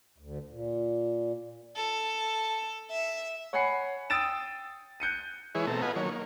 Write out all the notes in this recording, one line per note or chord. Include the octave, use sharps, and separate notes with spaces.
D2
A#2
A4
E5
C#5 F#5 G#5 B5 C7 C#7
G5 D#6 E6 A6 D7 E7
F#6 G6 C#7 D#7
E3 G#3 E4 G#4 B4 C#5
B2 A3 C4 A4 A#5
B3 F4 B4 D#5 F#5 G#5
D#3 F#3 A#3 C#5
A#3